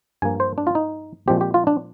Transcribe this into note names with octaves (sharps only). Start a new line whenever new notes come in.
G2 F3 A#3 G#5
C5
D4
F4
D#4
A#2 F3 G#3 C4 G4
G4
F4
D4